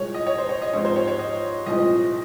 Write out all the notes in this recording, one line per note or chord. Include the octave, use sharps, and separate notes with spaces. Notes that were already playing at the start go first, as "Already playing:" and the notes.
Already playing: C2 A#2 G#3 C#5
D#5
C#5
C5
C#5
D#5
G#2 F3 G#3 C4 C#5
C5
C#5
C#5
D#5
C2 A#2 F3 G#3 C4 D#5